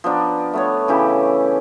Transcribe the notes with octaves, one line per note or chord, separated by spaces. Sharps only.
F3 B3 D4 A#5
A3 B3 C#5
C#3 E3 E4 G4